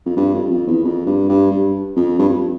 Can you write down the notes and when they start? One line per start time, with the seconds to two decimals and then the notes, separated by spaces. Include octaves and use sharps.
0.06 F2
0.17 G2
0.34 F2
0.50 F2
0.67 E2
0.84 F2
1.06 G2
1.29 G2
1.51 G2
1.96 F2
2.18 G2
2.29 F2